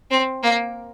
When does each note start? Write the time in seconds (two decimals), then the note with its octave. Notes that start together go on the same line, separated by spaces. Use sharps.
0.11 C4
0.43 A#3